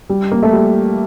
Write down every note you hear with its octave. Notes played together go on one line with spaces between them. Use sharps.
G3
A#3
A3
G3